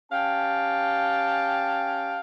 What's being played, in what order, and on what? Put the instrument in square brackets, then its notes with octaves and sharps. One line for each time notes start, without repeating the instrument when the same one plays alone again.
[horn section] C#4 G4 F5 G5 A5